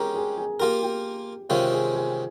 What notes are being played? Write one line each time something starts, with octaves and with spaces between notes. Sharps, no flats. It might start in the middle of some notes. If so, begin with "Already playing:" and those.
Already playing: G#3 C#4 G4 G#4 A#4 A#5
G#4 G#5
G#4 G#5
A#3 F4 G4 A#4 G5
G4 G5
C3 D#3 G#3 C#4 F4 F5
G#4 G#5
G#4 G#5